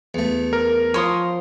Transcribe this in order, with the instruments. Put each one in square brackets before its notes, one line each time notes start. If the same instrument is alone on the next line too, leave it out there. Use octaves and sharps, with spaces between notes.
[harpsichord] E2 A3
[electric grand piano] A#4
[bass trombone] F3 [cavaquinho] C#5 C6 D#6